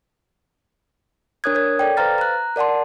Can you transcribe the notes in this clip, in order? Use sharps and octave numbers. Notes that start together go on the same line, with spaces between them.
D4 A#4 C#5 D#6 F#6 G#6
A#4 C#5 G#6
A4 D5 G5
B4 C5 F5 A#5 F6 A6
A#5 F#6
A#4 D5 F#5 A5 C6